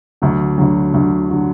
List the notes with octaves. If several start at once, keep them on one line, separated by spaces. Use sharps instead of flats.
D2 D3 F#3
D2 D3 F#3
D2 D3 F#3
D3 F#3